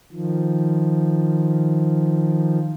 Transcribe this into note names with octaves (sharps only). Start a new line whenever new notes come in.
D#3 F3